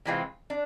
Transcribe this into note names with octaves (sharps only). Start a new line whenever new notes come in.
C3 E3 G#3 C4 F4
D4